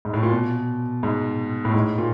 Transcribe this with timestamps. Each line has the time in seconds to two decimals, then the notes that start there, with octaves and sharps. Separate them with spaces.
0.05 G#2
0.14 A2
0.23 A#2
0.32 B2
1.03 G#2
1.65 A2
1.74 G#2
1.98 A#2